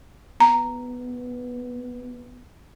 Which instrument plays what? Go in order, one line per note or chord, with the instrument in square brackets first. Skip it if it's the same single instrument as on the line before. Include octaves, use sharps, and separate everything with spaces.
[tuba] B3 [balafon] A#5